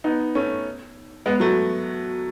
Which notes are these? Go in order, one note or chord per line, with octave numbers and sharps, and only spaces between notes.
B3 D#4
A3 C#4
G#3 B3
F#3 A3